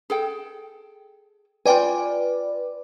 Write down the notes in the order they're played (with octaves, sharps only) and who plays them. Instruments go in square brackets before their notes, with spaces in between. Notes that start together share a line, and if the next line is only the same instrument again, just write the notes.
[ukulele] G#4 A4 G5
[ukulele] F4 G5 G#5 [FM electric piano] B4 D5